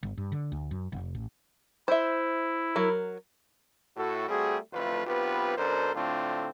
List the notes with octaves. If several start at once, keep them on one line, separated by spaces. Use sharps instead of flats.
G1
G2
D3
D2
F#2
F1
A1
E4 C5 E5
F#3 A#4
A2 F#4 A4
G3 A3 C4 F#4 G#4
A1 F2 D3 A3 F4 B4
B1 B3 C4 F4 G4 B4
F#2 B2 D4 A4 A#4 C5
A2 D3 A3 C4 D4 F4